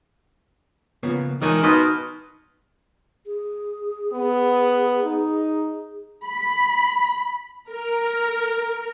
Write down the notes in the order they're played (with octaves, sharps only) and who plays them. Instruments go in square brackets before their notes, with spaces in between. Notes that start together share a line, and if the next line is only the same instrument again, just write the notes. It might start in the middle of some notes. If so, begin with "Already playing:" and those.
[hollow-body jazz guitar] C#3 A#3 B3 [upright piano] F3
[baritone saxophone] D#3 [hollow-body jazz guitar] E3 G#3 G#5 [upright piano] F6 F#6
[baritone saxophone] B2 [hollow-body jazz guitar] D#4 [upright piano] C6 D#6 F6
[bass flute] G#4
[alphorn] B3
D#4
[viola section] B5
A#4